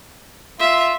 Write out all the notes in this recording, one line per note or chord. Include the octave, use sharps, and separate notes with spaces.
F4 E5